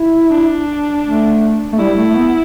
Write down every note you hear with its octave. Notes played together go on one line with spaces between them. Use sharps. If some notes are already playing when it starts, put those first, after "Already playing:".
Already playing: E4
D4
A3
A3
G3 E4
A3
A3
B3